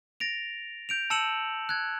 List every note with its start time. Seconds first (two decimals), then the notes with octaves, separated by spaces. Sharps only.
0.20 A6 A#6 D7 F7
0.89 G6 D7 F7
1.10 A5 E6 C#7 E7 F#7
1.69 F#6 G#6